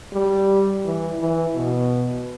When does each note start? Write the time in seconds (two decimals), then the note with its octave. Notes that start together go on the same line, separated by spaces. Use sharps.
0.13 G3
0.85 E3
1.19 E3
1.55 B2